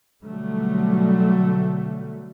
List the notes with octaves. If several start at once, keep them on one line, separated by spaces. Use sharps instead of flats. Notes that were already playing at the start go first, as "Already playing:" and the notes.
B2 D3 F#3 G3 A3